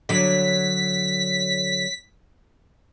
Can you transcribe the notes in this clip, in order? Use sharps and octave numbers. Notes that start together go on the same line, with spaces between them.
D3 F#3 B6